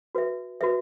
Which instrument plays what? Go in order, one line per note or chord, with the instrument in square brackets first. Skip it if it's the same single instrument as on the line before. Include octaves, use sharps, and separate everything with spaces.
[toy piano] F#4 B4 E5
F#4 B4 E5